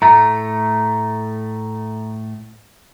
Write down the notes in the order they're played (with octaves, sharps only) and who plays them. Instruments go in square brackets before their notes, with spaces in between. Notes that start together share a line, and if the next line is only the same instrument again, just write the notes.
[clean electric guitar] A2 A3 [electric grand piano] A#5